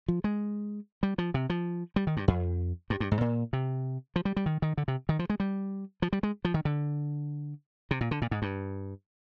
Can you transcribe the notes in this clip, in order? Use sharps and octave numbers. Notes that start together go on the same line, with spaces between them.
F3
G#3
G3
F3
C3
F3
G3
D#3
G2
F2
G2
G2
G#2
A#2
C3
F3
G3
G3
D#3
D#3
D3
C3
D#3
F3
G#3
G3
F3
G3
G#3
F3
D#3
D3
C3
A#2
D3
A#2
G#2
G2